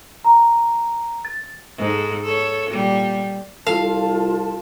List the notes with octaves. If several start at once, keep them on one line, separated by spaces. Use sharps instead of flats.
A#5
A6
G#2 A4
A4 C#5
A#2 G3
C2 F4 A4 F5 A5